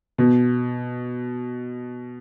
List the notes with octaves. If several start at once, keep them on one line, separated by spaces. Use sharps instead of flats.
B2